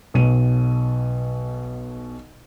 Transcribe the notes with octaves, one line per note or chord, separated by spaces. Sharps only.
B1 B2 D#7